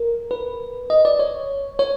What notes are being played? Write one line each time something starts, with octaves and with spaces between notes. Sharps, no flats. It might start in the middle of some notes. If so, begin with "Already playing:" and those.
Already playing: A#4
B4
D#5
D5
C#5
C#5